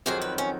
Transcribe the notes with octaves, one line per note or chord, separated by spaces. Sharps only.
F2 D#3 F#3 G#4
B4
C#4